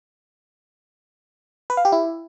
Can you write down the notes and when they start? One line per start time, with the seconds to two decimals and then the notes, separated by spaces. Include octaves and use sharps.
1.70 B4
1.77 F5
1.85 G4
1.92 E4